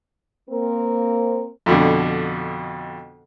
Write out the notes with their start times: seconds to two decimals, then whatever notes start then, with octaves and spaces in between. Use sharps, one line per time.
0.50 A#3 C4 A#4
1.66 F2 B2 D3